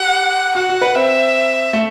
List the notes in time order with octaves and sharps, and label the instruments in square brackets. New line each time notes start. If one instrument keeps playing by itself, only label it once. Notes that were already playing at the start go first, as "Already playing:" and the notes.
Already playing: [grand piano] G4 [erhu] F#5
[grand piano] F#4 [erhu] F#5
[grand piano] F#4
B4
[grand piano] C4 [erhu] E5
[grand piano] A3